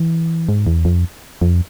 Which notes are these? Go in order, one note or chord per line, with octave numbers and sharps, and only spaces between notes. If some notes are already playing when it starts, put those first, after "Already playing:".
Already playing: E3
G#2
E2
F2
F2